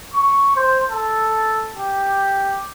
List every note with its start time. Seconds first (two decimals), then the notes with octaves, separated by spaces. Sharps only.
0.13 C#6
0.56 C5
0.90 A4
1.77 G4